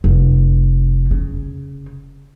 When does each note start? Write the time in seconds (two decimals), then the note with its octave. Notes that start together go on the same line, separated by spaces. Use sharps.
0.04 F1
1.11 C#3